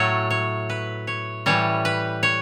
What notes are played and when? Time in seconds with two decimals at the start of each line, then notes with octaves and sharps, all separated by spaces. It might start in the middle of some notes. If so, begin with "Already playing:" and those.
Already playing: A2 F#3 A3 C#5
0.30 C#5
0.70 B4
1.07 C#5
1.46 A2 E3 G3 C#5
1.85 B4
2.23 C#5